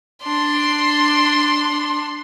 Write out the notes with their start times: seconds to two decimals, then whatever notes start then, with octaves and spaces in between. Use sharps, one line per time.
0.24 D4 C6